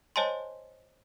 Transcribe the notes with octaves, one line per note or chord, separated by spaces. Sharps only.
C5 C#5 D#5 G#5 A5 C6